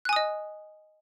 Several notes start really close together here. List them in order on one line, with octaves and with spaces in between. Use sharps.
F#6 G#5 D#6 D#5